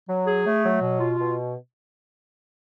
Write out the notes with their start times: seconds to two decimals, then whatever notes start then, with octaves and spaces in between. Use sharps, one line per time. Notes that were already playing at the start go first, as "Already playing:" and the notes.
0.08 F#3
0.26 G#4
0.46 A3
0.64 F#3
0.82 B2
1.00 F4
1.19 B2